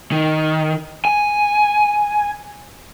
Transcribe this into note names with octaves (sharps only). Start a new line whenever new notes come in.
D#3
G#5